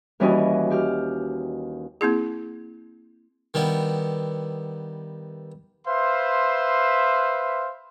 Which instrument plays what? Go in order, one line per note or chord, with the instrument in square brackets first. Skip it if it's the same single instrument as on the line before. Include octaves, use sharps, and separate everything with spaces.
[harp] D#2 E3 G3 C#4 F#4 D#5
F#4 G4 F6
[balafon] A#3 C4 E4 G#4
[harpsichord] D#3 G3 B3 E4
[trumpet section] B4 C5 E5 F5 C6